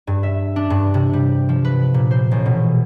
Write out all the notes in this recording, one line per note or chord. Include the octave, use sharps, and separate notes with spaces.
G2
E5
D4
G2
C3
G3
F3
B4
A#2
C5
A1
B2